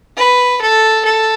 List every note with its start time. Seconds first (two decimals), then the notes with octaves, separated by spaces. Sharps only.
0.17 B4
0.61 A4
1.05 A4